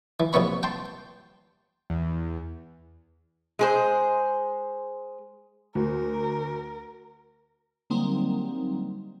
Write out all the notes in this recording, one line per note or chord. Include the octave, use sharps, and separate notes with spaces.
E3
A#1 C3 A#3 B3 C#5 B5
G5 A5 C6
E2
G#3 G#4 C5
D2 A#4
D3 F#3 G3 A#3 C4 D#4